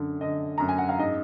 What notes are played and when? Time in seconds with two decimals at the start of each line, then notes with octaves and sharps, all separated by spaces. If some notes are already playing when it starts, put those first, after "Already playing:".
Already playing: F#2 D3
0.21 D3 D#5
0.58 F#2 A#5
0.69 G#5
0.78 F#5
0.89 F5
0.98 G#2 D#5